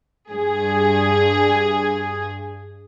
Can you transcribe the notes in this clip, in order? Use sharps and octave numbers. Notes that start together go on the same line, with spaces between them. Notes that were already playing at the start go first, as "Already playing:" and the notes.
G2 G#4